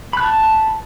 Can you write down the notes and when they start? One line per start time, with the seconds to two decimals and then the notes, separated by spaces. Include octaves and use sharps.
0.13 B5
0.17 F#6
0.21 A5